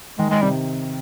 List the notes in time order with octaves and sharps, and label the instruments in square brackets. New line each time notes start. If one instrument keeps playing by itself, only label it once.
[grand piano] D#3 [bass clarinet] G#3
[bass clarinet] G#3
[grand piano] C3 [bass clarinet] G3